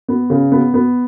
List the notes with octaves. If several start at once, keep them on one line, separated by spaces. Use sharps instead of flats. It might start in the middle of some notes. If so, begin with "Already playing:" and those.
B3
C#3
B3
B3